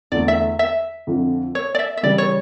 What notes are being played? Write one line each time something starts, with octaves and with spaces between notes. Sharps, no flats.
E2 D3 A3 D5
E5
E5
F2 D3 F3
C#5
D5
E5
E5
C#3 E3 G3 D5
C#5